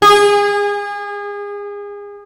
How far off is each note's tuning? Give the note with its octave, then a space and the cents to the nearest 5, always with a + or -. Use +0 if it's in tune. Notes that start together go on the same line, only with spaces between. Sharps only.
G#4 -30